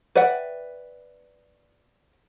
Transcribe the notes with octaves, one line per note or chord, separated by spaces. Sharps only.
B4 D5 E5 F#5 G5